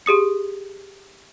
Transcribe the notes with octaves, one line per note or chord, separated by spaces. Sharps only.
G4 G#4 D#6 C#7